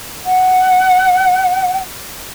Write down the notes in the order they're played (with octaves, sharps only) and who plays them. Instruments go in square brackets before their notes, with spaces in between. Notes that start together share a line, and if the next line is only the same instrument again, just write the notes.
[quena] F#5